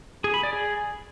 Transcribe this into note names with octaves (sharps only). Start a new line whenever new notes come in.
G#4
B5
D5
G#4